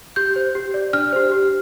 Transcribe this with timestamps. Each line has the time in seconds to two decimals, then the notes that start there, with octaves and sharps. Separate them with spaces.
0.16 G4 G6
0.36 C5
0.55 G4
0.74 D5
0.93 D4 F6
1.13 G4 C5
1.32 G4